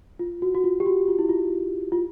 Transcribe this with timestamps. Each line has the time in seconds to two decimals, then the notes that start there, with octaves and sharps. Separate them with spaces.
0.19 F4
0.42 F#4
0.55 F#4
0.64 F4
0.80 G4
0.86 F#4
1.08 F4
1.19 E4
1.29 F4
1.92 F4